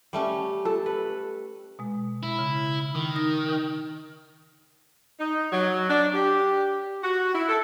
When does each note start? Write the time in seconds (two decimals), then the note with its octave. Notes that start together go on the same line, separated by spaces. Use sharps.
0.13 G3 A3 C#4
0.65 A4
0.86 B4
1.79 B2 G#3
2.23 E4
2.39 C#3
2.95 D#3
3.16 D#4 A#6
5.19 D#4
5.52 F#3
5.90 D4
6.14 G4
7.04 F#4
7.34 E4
7.49 A4